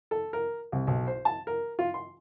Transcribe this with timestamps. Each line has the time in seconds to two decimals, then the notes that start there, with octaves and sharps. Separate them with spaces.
0.11 A4
0.33 A#4
0.72 C2
0.87 B1
1.07 C5
1.25 A5
1.47 A#4
1.79 F4
1.94 C6